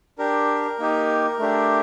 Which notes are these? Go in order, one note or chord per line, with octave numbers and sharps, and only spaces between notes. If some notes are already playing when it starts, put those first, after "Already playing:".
D4 G4 A#4
A#3 D#4 G4
A3 D4 G4